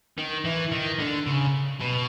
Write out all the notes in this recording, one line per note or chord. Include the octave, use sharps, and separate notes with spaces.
D#3
E3
D#3
D3
C#3
B2